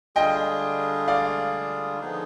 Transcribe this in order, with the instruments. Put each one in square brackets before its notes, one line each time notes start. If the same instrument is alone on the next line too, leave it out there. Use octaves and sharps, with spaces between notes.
[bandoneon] D3 G3 D4 F4 G#4 [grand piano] D#5 G5
[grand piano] D5 F5
[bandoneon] D3 F3 B3 D#4 G#4